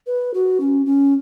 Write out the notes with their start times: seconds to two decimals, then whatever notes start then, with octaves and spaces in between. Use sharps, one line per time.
0.06 B4
0.34 F#4
0.60 C#4
0.86 C#4